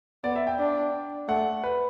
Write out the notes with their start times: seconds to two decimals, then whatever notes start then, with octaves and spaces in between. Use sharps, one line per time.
0.24 B3 D5
0.36 E5
0.47 G5
0.59 D4
1.29 A3 F#5
1.64 B4